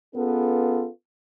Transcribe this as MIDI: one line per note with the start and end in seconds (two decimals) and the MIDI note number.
0.15 0.89 59
0.15 0.89 61
0.15 0.89 65
0.15 0.89 68
0.15 0.89 69
0.15 0.89 71